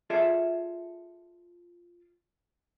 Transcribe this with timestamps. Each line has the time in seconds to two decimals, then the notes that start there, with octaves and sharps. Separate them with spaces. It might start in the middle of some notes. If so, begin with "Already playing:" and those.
0.10 F4 G#4 A4 D5 E5